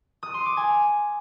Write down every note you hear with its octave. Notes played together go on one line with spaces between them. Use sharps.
D#6
C6
D6
G#5